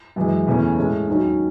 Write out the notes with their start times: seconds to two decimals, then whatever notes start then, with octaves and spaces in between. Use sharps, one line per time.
0.16 F#2 E3 G#3
0.47 E2 C#3 E3 A3 C#4
0.77 A2 G#3 C#4
1.08 D#2 D#3 F#3 C#4